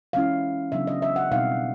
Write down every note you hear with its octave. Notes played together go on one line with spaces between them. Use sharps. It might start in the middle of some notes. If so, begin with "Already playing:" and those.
E3 G#3 C#4 E4 F5
C#3 F#3 B3 D4 E5
D#5
E5
F#5
B2 G3 C4 D#4 F5